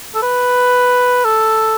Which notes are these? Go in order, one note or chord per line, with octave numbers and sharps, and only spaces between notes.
A4
B4
A4